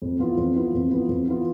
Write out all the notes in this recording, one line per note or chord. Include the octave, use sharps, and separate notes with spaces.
F2
E3 B3 F4
F2
E3 B3 F4
F2
E3 B3 F4
F2
E3 B3 F4